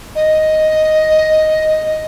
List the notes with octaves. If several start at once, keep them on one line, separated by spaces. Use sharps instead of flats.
D#5